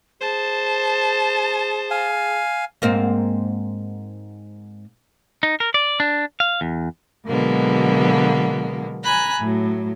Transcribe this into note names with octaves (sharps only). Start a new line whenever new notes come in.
G#4 C5 A5
F5 G#5
G#2 A#3 C4
D#4
A#4
D5
D4
F5
E2
B2 D3 F#3 G#3 A#3 B3
G#5 A#5 B5 F#6
A2 F#3